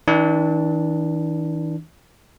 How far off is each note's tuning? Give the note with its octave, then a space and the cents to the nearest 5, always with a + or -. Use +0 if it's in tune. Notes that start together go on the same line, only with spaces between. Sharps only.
E3 -45 D4 +0